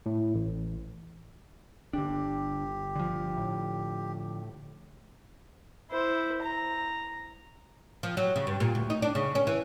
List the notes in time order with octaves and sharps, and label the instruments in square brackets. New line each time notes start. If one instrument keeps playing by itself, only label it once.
[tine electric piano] A2
A1
[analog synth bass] G1 [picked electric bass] D3 D4 [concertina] G4
[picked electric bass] D3 F3
[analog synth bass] A2
[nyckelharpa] E4 C5
A#5
[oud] F3
F#3
C#3
G2
A#2
D2
D#4
D4
C#3
C#4
E3